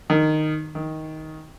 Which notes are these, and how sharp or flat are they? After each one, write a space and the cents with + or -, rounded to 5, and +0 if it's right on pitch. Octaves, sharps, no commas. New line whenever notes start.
D#3 -10
D#3 +10